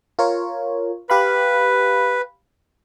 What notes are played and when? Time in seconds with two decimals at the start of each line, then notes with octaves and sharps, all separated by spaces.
0.19 F4 A#4 C#5
1.10 G4 B4 F5 B5